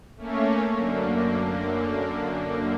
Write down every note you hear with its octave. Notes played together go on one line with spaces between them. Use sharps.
A3 A#3 C#4 C#5
F#2 D3 A#3